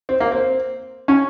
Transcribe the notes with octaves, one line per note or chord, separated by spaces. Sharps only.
C4
A#3
C4
C#4